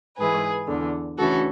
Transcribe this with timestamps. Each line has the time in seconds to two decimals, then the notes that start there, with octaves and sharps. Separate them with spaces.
0.17 G#2 E3 G#4 B4
0.68 E2 D3
1.18 D2 C#3 E3 F#4 A4